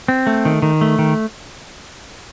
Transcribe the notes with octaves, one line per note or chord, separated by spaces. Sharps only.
C4
A3
D#3
D#3
A3
D#3